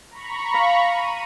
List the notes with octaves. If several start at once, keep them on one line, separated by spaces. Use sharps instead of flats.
A#5 B5 C#6
F5
D#7